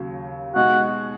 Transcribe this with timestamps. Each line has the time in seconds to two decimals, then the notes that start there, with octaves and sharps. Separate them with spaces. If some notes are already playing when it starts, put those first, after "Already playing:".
Already playing: D#2 C#3 F#3
0.55 B2 G#3 D#4 F#4